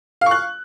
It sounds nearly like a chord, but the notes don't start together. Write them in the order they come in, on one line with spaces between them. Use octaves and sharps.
F5 C#6 F#6